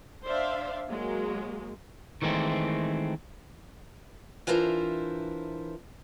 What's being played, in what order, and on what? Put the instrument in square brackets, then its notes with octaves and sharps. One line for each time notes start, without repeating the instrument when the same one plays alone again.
[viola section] D4 C5 D5 E5 F5
F#3 G#3 A#3
[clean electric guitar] D#3 E3 G#3 A3 C4
[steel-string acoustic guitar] E3 D4 E4 F4 A#4 C5